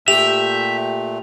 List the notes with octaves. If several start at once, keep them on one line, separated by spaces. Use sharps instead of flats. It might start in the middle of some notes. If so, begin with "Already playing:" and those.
A#2 A3 G4 E5 F7